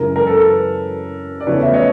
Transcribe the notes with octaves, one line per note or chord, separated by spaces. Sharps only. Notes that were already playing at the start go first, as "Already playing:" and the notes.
Already playing: F#2 C#3 E3 G#3 A#4
A#4
A4 B4
D5
E2 C#3 F3 A3 B4 C#5
E5
C#5 D#5